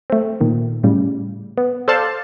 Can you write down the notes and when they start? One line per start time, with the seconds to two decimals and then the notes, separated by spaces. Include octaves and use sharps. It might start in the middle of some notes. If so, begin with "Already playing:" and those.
0.10 A3 C4
0.41 A#2 D#3
0.84 A2 C#3 G3
1.58 B3
1.88 A4 C5 D5 F5 A5